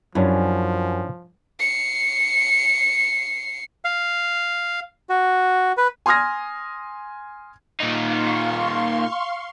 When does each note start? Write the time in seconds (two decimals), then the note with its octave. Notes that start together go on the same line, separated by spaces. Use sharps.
0.15 F#2 F3 C#4 D4 E4
1.60 C7 C#7
3.85 F5
5.09 F#4
5.77 B4
6.06 G#5 C6 D#6 F6 G#6 A#6
7.80 A#2 D#4 F5 C6 C#6